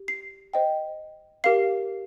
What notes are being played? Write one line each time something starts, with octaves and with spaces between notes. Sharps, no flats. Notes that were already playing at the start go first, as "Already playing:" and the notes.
Already playing: G4
C7
C5 D#5 G5
G4 A#4 F5 C7